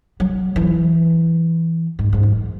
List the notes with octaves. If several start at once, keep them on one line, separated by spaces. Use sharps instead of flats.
F#3
E3
G#2
G#2
F#2